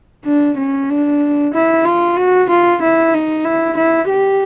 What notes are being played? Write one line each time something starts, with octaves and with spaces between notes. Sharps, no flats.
D4
C#4
D4
E4
F4
F#4
F4
E4
D#4
E4
E4
G4